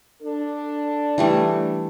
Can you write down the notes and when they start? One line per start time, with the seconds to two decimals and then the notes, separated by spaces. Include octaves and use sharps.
0.22 D4 A4
1.18 E3 G3 A3